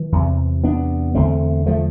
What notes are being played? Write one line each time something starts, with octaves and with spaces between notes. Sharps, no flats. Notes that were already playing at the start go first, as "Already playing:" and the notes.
Already playing: E3
E2 C3
B3 D4
E2 D3 A3 C4
F3 A3